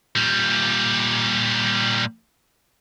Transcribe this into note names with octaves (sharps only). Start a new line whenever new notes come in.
A#2 G3